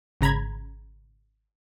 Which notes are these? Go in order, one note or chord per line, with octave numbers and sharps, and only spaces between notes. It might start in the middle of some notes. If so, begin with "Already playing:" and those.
G#1 C#3 A#5 B5 G#6